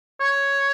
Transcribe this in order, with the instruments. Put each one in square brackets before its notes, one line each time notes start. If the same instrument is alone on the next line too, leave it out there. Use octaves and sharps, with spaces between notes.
[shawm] C#5